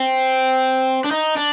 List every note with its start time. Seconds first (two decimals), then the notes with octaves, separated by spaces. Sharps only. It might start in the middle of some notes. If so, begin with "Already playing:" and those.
Already playing: C4
1.04 D4
1.11 D#4
1.37 D4